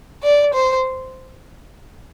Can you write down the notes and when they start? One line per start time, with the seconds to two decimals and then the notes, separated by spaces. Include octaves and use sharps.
0.23 D5
0.54 C5